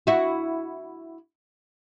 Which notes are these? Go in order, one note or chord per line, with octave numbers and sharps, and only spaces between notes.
E4 F#4